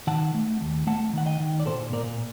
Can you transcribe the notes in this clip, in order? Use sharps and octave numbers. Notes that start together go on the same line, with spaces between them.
D#3 F#5 A5
A3
D#2
A3 F#5 A5
D#3 F#5
D#5 G5
D#3
D5
A#2 A4 C5
A#2 A#4 D5